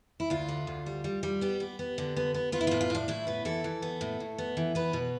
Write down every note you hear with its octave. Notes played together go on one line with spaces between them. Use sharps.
E4
D2 F4
D3
D2
G3
G3
G3
B3 G4
B3
B3
D3
B3
B3
B3 F4
E4
A2 F4
F4
A2 D4
A2 E4
B3 B4
E3 A4
E3
B3
A2
A2
B3
E3
B3 B4
B2